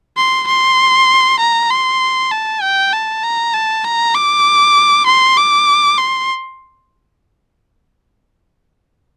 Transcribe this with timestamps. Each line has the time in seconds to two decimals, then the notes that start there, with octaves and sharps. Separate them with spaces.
0.17 C6
0.48 C6
1.40 A#5
1.70 C6
2.31 A5
2.62 G5
2.93 A5
3.23 A#5
3.54 A5
3.85 A#5
4.15 D6
5.06 C6
5.37 D6
5.98 C6